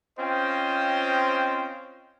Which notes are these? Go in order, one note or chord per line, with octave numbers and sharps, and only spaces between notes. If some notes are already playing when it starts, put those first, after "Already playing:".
C4 C#4 F4 C5 D#5 G5